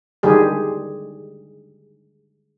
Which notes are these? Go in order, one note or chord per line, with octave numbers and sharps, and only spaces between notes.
D3 D#3 G3 G#3 G4 G#4